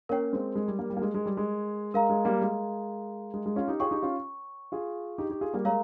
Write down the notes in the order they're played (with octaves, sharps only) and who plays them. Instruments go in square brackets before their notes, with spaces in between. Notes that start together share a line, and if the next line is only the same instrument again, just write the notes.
[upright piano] A#3 C#4 [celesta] A#4 C#5 G5
[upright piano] G#3 C4
G#3
G3
G3 A#3
G3
A#3
G#3
G#3
G3
G#3
[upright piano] G#3 [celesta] A#4 F5 A#5
[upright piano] G#3
G3 A#3
G#3
G#3
G#3
C#4 F4
D#4 G4
[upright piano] F4 G#4 [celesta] C#5 G5 C#6
[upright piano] D#4 G4
C#4 F4
F4 G#4
D#4 G4
D#4 G4
F4 G#4
G3 A#3
[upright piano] G#3 [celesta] A#4 C#5 F5 A#5